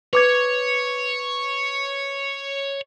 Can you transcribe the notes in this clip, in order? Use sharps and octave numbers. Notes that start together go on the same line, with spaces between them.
B4 C#5 D6 G#6